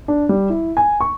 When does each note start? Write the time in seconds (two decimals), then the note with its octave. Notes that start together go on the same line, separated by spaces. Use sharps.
0.08 D4
0.29 G3
0.50 E4
0.77 G#5
1.01 C#6